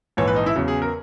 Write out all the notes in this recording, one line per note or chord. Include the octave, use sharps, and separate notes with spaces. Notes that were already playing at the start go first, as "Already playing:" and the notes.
A#1 G#2 E3 C#5
B4
D#4
E4
E2 C#3 F#3
G#4
A#4